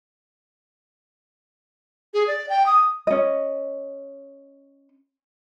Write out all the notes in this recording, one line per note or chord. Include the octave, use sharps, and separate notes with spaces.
G#4
D5
G5
D#6
C#4 D#5